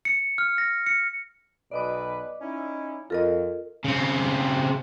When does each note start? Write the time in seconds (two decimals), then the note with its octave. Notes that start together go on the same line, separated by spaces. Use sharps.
0.05 C#7
0.38 F6
0.58 A#6
0.86 C#7
1.71 B1 B2 B4 D5 D#5 D6
2.41 C#4 D#4 E4
3.10 F2 F4 A4 A#4 D#5
3.84 C#3 C4